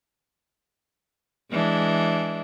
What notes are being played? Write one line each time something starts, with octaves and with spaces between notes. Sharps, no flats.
E3 G#3 D4